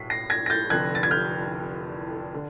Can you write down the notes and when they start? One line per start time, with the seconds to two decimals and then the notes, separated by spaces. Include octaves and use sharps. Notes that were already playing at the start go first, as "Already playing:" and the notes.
Already playing: B1 A2 B6 C7
0.10 A#6 C7
0.30 G#6 A#6
0.46 A#6
0.50 G6 A6
0.70 F1 F2 D3 F#6 G#6
0.95 A6
1.03 G#6
1.11 F6 G6
2.34 D3